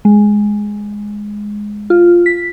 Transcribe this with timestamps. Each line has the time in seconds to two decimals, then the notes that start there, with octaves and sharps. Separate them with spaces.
0.05 G#3
1.90 F4
2.26 B6